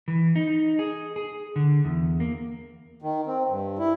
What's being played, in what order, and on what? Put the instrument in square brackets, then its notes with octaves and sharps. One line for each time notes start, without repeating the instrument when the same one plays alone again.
[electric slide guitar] E3
D#4
G#4
G#4
D3
E2
A#3
[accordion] D#3
C4
G2
E4